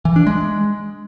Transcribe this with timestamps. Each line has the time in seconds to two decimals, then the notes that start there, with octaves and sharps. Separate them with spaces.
0.05 E3
0.16 D4
0.27 G#3